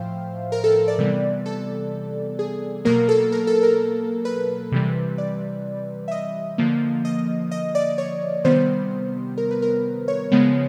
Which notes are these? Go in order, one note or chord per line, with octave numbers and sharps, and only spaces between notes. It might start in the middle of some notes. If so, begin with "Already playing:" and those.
Already playing: A2 F3 C5 E5 F5 G5
A#4
A4
D5
C3 E3 G3 B3
A4
G#4
B2 F#3 A#3 A#4
A4
A#4
A4
A#4
B4
C3 E3 G3
D5
E5
D#5
D3 F3 A#3
D#5
D#5
D5
C#5
C3 D#3 G3 B3 C5
A#4
B4
A#4
C#5
C#3 F3 G#3 B3